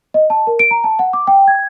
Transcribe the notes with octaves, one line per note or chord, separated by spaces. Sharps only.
D#5
A5
A#4
D7
A#5
A5
F#5
D6
G5
G#6